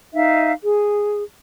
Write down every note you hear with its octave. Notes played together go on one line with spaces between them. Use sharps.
D#4 E5 F5
G#4